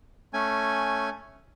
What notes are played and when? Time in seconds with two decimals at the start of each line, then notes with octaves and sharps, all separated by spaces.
0.34 A3 C#4 G#5